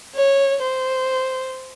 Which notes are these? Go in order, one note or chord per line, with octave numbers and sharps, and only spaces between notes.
C#5
C5